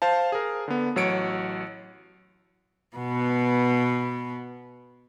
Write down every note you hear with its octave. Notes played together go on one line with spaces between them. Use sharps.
C5 F5 A5
G#4 A#4
D3 B3
A1 F#3 C#5 C#7 D7
B2 B3